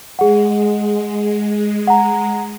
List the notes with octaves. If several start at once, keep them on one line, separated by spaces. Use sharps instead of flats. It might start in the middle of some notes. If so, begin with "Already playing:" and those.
G#3 G#4 F#5
F#5 A#5